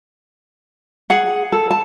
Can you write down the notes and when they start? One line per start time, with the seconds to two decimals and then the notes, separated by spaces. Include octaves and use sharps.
1.10 G#4 F#5
1.52 A4
1.71 A5